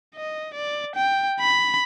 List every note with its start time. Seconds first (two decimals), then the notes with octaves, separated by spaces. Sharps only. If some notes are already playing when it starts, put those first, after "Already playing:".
0.15 D#5
0.54 D5
0.95 G5
1.40 B5